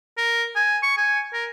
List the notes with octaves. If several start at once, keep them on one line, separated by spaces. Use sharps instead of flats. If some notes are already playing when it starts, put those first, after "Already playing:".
A#4
G#5
C#6
G#5
A#4